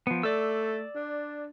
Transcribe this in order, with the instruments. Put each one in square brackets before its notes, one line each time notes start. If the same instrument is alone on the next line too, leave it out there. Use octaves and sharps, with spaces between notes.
[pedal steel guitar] F3 B3
[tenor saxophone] A3 [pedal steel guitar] D5 E6
[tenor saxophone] D4